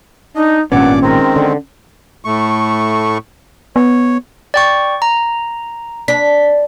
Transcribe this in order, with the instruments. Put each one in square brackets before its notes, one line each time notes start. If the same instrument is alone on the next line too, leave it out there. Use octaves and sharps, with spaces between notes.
[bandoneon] D4 D#5 [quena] D#4
[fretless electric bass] G#1 A#2 B3 [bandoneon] G2 D5 D6 [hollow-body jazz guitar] C#4 [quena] F#5
[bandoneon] D#3 G#3 C4 [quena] A#4
[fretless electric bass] D3
[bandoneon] A2 A3 C#6
[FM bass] B3 [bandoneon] C#5
[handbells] D5 G5 C#6
A#5
[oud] D4 [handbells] B6